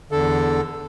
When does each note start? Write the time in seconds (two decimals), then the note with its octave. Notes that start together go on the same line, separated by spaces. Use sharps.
0.12 E2 D3 A4